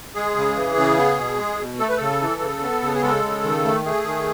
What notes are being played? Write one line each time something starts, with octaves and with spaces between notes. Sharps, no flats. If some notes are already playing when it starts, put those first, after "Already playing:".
G#3 G#4
C#3
E3
C#3
B3
B2
G#3
B2
A3 A4
B4
C#3 A4
E3
C#3
B3
C#3
G#4
G#3 A4
C#3
D#3
A3
A3 G#4
D#3